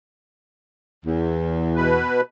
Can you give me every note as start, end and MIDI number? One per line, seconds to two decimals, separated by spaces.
1.05 2.02 40
1.76 2.21 47
1.76 2.21 71